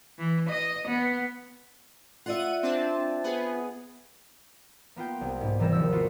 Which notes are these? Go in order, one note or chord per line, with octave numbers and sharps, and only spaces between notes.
E3
D#5
B3
F4 D5 E5 F#5 D#7
C4 D4 A5
B3 G#4
A#3 B3 F4 G5
C2
G#2 B3
G#1 C3 E3 G3 A#4 E7
D#2 F3 E6
B3 F4 F#4 D5